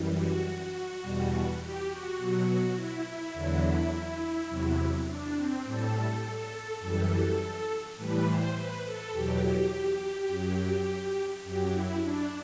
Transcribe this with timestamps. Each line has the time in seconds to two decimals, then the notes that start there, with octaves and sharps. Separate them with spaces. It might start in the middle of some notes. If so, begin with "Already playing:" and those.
Already playing: F#2 E3 G3
0.15 F#4
1.02 E2 B2 G3
1.60 G4
1.88 F#4
2.17 B2 F#3 F#4
2.75 E4
3.33 E2 D3 F#3
4.49 E2 C3 F#3
5.07 D4
5.36 C4
5.64 A2 G3 A4
6.80 F#2 E3 G3
7.96 A2 E3 G3 B4
8.25 C5
8.54 B4
8.83 A4
9.12 E2 B2 F#3 G4
10.27 F#2 F#3
11.44 F#2 F#3 G4
11.72 E4
12.01 D4